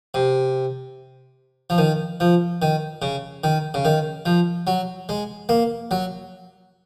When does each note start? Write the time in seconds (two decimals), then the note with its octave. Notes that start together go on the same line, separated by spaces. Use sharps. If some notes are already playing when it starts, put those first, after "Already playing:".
0.14 C3
1.70 F3
1.78 D#3
2.20 F3
2.62 D#3
3.02 C#3
3.44 D#3
3.74 C#3
3.85 D#3
4.26 F3
4.67 F#3
5.09 G#3
5.49 A#3
5.91 F#3